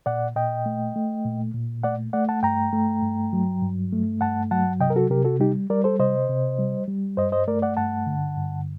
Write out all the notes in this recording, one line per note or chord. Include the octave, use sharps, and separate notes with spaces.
A#2 D5 F#5
A#2 D#5 G5
A3
A3
A#2
A#2
A3 D5 F#5
A3 D5 F#5
F#5 A5
G2 G5 A#5
A3
G2
F#3
G2
A3
G2 F#5 A5
F#3 F#5 A5
C3 D#5 G5
A#4
F#4 A4
C3 G4 A#4
F#4 A4
G3 D#4 G4
G3 A#4 D5
A4 C5
C3 C5 D#5
C3
G3
G3
G2 C5 D#5
C5 D#5
A3 A#4 D5
D5 F#5
G2 F#5 A5
D3
G2